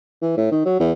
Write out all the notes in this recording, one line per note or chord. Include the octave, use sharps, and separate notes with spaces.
E3
A2
D#3
F#3
E2